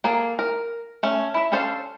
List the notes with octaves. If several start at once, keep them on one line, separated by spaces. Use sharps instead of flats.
A#3 G#4 A4
A#4
A3 C#4
E4 E5
C#4 D4 A4 C5 F5